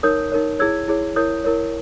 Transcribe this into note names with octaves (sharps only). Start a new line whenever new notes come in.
D#4 A#4 C#5 D#6 G6
D#4 A#4 C#5
E4 G#4 C#5 E6 G#6
E4 G#4 C#5
E4 A#4 C#5 D#6 G6
E4 A#4 C#5